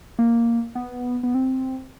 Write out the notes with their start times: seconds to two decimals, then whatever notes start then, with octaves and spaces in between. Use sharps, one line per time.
0.19 A#3
0.75 B3
1.23 B3
1.35 C4